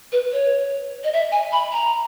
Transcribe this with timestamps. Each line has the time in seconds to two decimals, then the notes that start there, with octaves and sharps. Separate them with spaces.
0.12 B4
0.32 C#5
1.04 D#5
1.13 E5
1.32 G#5
1.52 B5
1.72 A#5